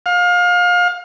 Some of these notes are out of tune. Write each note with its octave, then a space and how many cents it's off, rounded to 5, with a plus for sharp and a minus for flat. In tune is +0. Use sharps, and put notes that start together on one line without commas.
F5 +30